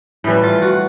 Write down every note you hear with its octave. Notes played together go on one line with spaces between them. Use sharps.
A2 E3 G3
F4
F#4